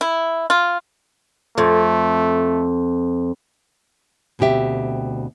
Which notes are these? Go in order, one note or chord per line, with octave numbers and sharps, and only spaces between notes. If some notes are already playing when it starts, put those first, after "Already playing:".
E4
F4
F2 A3
D2 B2 C4 G4 E5